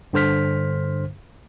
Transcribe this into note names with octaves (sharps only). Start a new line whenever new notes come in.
G2 D3 C5 F6 B6